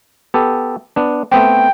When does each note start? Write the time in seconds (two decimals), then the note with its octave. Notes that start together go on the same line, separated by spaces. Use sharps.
0.34 B3 G4 A4
0.96 B3 D4
1.32 A3 B3 C4 G5